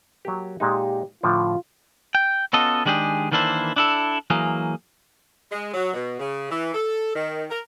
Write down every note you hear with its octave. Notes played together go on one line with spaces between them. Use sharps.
F#3 A#3 G4
A#2 G#3 D#4 G4
A2 D3 F3 F4
G5
B3 C#4 F4 F#4 A4 D#5
D#3 G#3 D4 G4 G#4
D#3 E3 A#3 D4 E4 C5
D4 E4 A4
E3 F#3 A#3 G#4
G#3
F#3
B2
C#3
E3
A4
D#3
A#4